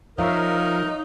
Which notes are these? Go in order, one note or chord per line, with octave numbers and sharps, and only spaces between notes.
F3 D#4 A#4 C#5 E5 F5